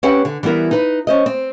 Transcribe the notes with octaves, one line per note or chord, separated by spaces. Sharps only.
C4 C#4 G4 B4 F#5
D3
E3 G3 B3 E4 A#4
D#4 B4
C#4 C5 D#5
C4